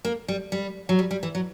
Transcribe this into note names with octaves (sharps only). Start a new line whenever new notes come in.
A#3
G3
G3
F#3
G3
G3
E3
F#3